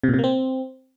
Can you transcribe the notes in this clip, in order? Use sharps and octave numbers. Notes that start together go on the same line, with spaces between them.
C3
A#2
C3
A#3
C4